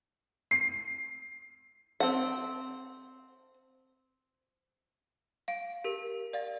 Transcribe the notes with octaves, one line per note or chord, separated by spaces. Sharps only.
C7
C4 F#5
F5 D7
G4 A#4 B6
D5 F5 A6